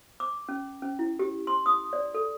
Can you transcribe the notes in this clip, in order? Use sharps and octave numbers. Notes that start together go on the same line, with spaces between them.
D6
C#4
C#4
E4
G4
C6
D#6
D5
A4